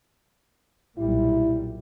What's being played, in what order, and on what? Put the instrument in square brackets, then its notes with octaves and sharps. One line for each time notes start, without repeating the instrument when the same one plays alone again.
[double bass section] B1 A#2 G3 [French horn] E4